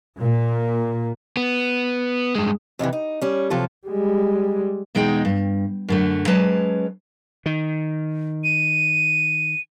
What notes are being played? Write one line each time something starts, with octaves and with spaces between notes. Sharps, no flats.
A#2
B3
G2 G#3
F2 C3 D#3 E3
D#4
G3 C#4
C3 F3 F#3 F4 A4
G3 G#3
E2 B2 G#3 D#4 G#4 G5
G2
F#2 D3 A3
F#3 G#3 C#4 B4 A5
D#3
D#7